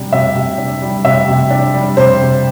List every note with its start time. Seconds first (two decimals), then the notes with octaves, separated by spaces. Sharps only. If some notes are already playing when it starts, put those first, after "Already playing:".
Already playing: C3 G3 D4
0.12 C3 E5
0.36 C3
0.58 D4
0.82 G3
1.04 C3 E5
1.28 C3
1.51 D4
1.74 G3
1.97 C3 C5
2.21 C3